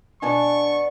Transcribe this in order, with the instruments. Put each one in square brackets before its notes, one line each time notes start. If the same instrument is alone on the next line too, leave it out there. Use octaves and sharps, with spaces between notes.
[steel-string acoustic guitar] B2 B3 D5 [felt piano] D4 G#5 A5 [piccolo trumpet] C#6